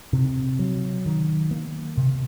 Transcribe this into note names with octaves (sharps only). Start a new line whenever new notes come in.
C3
F#3
D#3
A#3
C3